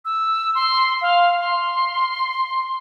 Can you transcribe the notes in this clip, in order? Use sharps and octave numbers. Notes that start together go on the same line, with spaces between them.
E6
C6
F5
C6